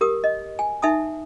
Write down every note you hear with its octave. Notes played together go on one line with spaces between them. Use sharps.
G4 A#4 D#6
D#5
G#5
D#4 E5 G#5 A5 D#6